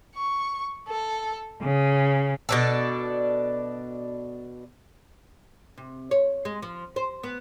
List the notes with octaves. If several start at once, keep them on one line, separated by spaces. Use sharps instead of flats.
C#6
A4
C#3
B2 D4 A4
C3
C#5
G#3
F3
C5
B3